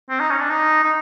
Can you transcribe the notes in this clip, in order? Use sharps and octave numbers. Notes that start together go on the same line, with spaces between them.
C4
D#4
C#4
D4
D#4
D#4